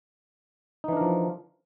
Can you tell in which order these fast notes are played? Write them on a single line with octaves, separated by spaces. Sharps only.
D#4 E3 D4 A#4 F3